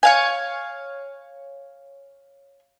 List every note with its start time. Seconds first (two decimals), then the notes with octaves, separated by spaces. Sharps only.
0.03 C#5 F5 G#5